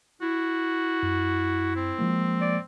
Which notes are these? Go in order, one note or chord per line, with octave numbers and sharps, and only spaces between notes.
E4 F#4
F#2
C4
F3 G#3 A#3
D5